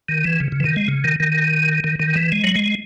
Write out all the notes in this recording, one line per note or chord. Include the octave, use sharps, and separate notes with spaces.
D#3
E3
C#3
C#3
E3
D#3
G#3
C#3
D#3
D#3
D#3
D#3
E3
G#3
F#3
G#3